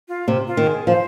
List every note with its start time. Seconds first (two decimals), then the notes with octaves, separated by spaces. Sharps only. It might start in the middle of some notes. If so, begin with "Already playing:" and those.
0.08 F4
0.28 C3
0.47 F4
0.57 D#3
0.67 G#4
0.87 F3 C5